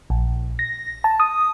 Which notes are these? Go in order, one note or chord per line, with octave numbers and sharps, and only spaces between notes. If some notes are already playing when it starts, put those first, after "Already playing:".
A#1
A#6
A5
D#6